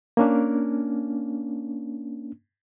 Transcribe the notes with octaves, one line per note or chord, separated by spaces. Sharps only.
A#3 C#4 D4